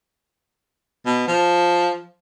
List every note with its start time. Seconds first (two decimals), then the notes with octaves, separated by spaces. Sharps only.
1.06 B2
1.28 F3